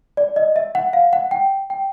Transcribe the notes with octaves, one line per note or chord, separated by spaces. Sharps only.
D5
D#5
E5
F#5
F5
F#5
G5
G5